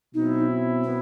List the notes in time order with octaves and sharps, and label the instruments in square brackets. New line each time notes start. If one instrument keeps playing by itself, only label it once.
[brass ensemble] B2 F#3 C4 E4 [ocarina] D#4
[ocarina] B3